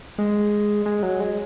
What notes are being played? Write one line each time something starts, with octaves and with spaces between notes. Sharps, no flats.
G#3
G#3
F#3
G#3